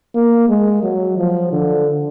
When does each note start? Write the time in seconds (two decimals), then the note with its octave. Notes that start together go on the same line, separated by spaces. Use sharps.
0.15 A#3
0.49 G#3
0.83 F#3
1.18 F3
1.52 D3